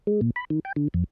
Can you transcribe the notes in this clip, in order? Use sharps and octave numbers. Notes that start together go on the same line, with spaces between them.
G#3
A#2
B5
D#3
G5
D3
F2